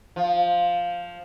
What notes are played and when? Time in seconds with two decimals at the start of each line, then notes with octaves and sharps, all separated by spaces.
0.16 F3